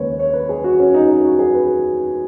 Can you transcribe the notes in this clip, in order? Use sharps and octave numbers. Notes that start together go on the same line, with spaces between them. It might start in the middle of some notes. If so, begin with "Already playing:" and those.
Already playing: D#2 C#3 G#3 B4 C#5
C#5
B4
G#4
F#4
C#4
D#4
D#4
F#4
G#4
B4